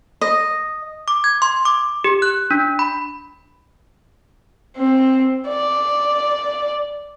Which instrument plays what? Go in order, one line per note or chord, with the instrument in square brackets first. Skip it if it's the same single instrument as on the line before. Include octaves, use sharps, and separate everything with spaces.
[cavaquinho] D#5
[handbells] D6
G#6
C6
D6
G4
F#6
D4
B5
[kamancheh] C4
D5